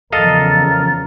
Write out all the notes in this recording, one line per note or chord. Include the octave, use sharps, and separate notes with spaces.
E2 C#3 F3 A4 A#4 D#5 F5 A6